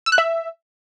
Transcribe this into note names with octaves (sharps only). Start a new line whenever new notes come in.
E6
F#6
E5